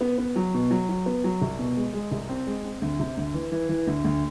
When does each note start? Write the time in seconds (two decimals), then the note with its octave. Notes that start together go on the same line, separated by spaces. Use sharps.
0.01 B3
0.18 B3
0.36 F#3
0.54 B2
0.71 F#3
0.89 F#3
1.06 B3
1.24 F#3
1.42 C2
1.59 B2
1.77 G#3
1.93 G#3
2.12 C2
2.29 C4
2.47 G#3
2.64 C4
2.82 D2
3.00 C3
3.17 D2
3.34 E3
3.52 E3
3.69 E3
3.87 D2
4.04 D2